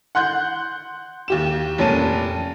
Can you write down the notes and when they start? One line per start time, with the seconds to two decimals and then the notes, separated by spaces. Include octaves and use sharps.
0.15 F#5 C6 F#6 G6
1.28 D#2 G4 E7
1.78 F1 A#2 C#4 A5 D#7